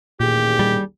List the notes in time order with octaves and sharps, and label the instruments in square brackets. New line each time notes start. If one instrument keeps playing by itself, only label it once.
[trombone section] A1 D#2 G#4 [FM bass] A#2 [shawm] G4
[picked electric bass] G3